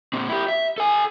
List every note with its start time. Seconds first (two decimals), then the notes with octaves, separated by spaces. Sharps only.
0.13 A#2 C4
0.29 E4 G4
0.48 E5
0.78 A4 G#5